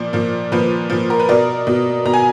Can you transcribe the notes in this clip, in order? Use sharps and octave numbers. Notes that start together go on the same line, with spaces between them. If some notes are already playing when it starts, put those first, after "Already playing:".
Already playing: A#2 F3 D5
A#2 F3
A#2 F3 B4
A#2 F3
A#4
B4
B2 A#4 D5
B2
B2 A#5
G#5